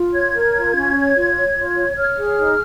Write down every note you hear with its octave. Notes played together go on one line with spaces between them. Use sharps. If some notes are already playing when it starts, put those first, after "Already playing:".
Already playing: F4
C#5 G#6
A#4
F4
C#4
C#5
F4
C#5
F4
C#5
C#5 F6
G#4
D#4